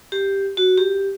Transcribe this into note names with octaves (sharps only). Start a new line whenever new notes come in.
G4
F#4
G4